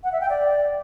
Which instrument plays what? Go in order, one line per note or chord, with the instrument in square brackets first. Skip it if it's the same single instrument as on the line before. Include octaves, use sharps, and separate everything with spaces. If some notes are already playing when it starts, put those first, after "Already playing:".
[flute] F#5
E5
G5
D5